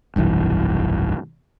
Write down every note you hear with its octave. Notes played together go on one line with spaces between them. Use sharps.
F1 B1 G2 E3